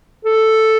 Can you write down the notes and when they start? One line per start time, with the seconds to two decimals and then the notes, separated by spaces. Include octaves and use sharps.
0.25 A4